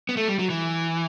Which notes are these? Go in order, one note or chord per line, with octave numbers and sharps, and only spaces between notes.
B3
A3
G3
F#3
E3